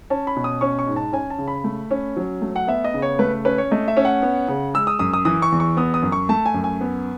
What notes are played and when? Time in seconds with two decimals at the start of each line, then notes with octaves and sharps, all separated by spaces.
0.10 C#4 A5
0.27 B5
0.36 B2
0.44 D#6
0.61 C#4 C#6
0.79 C#6
0.87 G#2
0.96 A5
1.13 C#4 G#5
1.30 A5
1.38 C#3
1.48 B5
1.64 A3
1.91 C#4
2.17 F#3
2.42 A3
2.56 F#5
2.67 B3 E5
2.84 D#5
2.94 C#3
3.02 C#5
3.19 A3 B4
3.45 C#4 B4
3.58 C#5
3.71 A3 D#5
3.88 E5
3.97 C#4
4.05 F#5
4.22 B3
4.48 C#3
4.74 G#3 E6
4.87 D#6
4.99 F#2 D#6
5.13 D#6
5.25 E3 D#6
5.42 C#6
5.52 E2
5.60 C#6
5.77 B3 D#6
5.94 D#6
6.03 F#2
6.12 C#6
6.29 A3 A5
6.46 G#5
6.54 F#2
6.64 G#5
6.81 B3